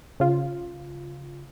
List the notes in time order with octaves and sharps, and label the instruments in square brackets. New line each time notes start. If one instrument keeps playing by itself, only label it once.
[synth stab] C#3 F4